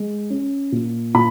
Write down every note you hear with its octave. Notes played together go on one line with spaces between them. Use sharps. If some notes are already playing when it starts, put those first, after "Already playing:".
Already playing: G#3
C#4
A#2
A#2 B5